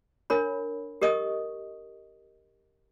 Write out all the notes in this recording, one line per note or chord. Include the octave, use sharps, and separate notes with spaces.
D4 A#4 C#5 B5
G4 A#4 D#5 C#6 D#6